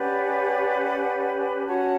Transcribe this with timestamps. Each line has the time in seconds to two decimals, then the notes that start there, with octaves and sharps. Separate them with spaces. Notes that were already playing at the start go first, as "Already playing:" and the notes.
Already playing: C#4 G4 B4 D5 F#5
1.66 C#4 F#4 C#5 F#5 A5